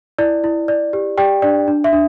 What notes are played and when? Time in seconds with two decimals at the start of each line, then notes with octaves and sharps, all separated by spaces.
0.18 E4 D5
0.44 E4
0.68 D5
0.93 G4
1.18 G4 D5 G5
1.42 D4 D5
1.68 D4
1.84 E5
1.93 D4